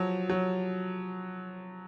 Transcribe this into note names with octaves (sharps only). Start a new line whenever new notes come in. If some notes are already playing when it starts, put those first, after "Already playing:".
Already playing: F3 F#3
F#3